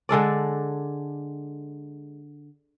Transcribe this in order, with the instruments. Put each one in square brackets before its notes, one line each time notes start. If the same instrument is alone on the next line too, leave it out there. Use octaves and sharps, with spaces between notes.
[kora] D3 G#3 A4 D5